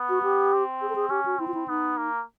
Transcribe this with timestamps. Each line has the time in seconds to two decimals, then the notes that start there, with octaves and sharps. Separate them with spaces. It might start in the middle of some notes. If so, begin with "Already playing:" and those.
Already playing: B3
0.09 F#4
0.23 G4
0.53 C4
0.82 G#4
0.89 A4
0.96 G#4
1.10 C#4 G4
1.26 F#4
1.39 C4 E4
1.48 F4
1.54 E4
1.68 B3 D#4
1.97 A#3